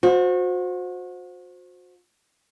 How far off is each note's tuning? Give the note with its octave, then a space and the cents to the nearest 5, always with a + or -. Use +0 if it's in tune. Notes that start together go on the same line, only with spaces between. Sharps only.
F#4 -35 C5 +0